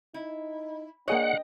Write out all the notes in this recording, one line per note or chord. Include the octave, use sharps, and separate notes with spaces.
D#4 E4
A#3 D4 G#4 C#5 D#5 F#5 G5